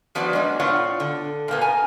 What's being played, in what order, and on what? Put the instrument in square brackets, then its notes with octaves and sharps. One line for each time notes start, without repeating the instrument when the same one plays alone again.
[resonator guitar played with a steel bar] F3 F#3 B3 F#4 B4 D5
G#3 A#3 D4 B4
A2 B3 F4 C#5 D5 F#5
D3
A#2 D3 A#3 B3
G#5 A#5